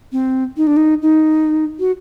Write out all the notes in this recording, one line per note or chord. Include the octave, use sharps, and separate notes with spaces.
C4
D#4
D4
D#4
D#4
F#4